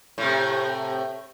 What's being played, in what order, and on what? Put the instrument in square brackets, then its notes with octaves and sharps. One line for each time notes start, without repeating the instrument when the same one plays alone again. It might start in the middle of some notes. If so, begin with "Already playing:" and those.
[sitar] A2 C3